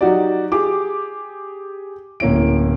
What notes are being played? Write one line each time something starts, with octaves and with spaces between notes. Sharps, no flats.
F#3 D#4 F#4 G4 D5
G4 G#4 D6
D1 A#3 C#4 E4 D7